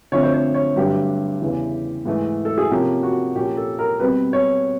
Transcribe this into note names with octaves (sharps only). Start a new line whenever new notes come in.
D3 F3 A3 C4 C#5
C5
C#5
C#5
G2 D3 F#3 A3 D4 G4
E2 C#3 E3
G#2 E3 A3
A4
G#4
C3 F3 A#3 C#4 G4
F#4
A#2 F3 A#3 C#4 G4
A4
A#4
B2 G3 C4 B4
C#5